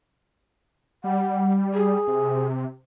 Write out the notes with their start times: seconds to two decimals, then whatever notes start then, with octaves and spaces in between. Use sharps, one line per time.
1.04 G3 F#5
1.74 G#4
2.07 C3